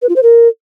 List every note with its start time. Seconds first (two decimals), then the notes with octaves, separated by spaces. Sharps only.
0.02 B4
0.09 F4
0.16 C5
0.23 A#4